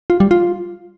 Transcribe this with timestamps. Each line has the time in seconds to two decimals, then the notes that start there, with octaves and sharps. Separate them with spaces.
0.10 F4
0.20 G3
0.31 F4